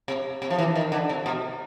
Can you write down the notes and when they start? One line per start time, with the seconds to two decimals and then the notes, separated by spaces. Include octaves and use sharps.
0.08 C3
0.42 C3
0.50 F3
0.58 E3
0.76 D#3
0.92 D3
1.09 C3
1.26 B2